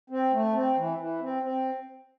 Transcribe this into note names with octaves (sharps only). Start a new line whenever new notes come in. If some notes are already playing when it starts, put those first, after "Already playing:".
C4
A3
C4
E3
E3
C4
C4